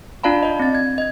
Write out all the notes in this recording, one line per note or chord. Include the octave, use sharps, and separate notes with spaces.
D4 F4 D5 F5 A5 B5
D5 D#5
C4 A6
G#6
D#5 G#6